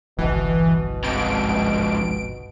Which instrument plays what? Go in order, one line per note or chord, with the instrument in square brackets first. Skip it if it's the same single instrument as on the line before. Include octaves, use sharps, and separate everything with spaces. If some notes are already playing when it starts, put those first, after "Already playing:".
[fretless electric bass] G1 C2 [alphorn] B2 [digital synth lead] E3
[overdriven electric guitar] F2 G#2 [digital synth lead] D7